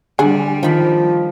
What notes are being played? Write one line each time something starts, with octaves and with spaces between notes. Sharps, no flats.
D3 G3 G#4
D#3 F3 B5